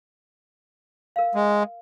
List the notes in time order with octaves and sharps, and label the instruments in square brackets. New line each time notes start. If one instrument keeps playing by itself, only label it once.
[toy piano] A#4 F5
[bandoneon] G#3